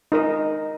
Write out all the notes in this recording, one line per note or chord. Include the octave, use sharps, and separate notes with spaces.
D#4 A#4 D#5